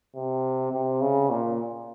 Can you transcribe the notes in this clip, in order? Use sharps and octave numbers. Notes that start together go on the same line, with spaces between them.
C3
C3
C#3
A#2